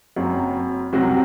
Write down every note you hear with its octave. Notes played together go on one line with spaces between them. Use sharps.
F#1 F#2 F#3 C4
C2 C3 F#3 C4 F#4